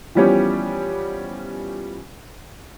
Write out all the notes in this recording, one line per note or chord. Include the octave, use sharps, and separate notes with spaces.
E3 F3 G3 B3 C#4 G4